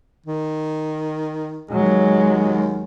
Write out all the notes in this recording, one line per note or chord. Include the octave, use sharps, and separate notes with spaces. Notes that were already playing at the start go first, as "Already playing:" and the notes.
D#3
D#2 F#3 G#3